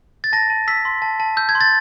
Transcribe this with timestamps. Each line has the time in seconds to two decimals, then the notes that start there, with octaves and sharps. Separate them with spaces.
0.24 A6
0.33 A5 A#6
0.50 A5
0.68 E6 B6
0.85 C6
1.02 A5
1.20 A5
1.37 E6 G6
1.49 G#6
1.55 C6
1.61 A6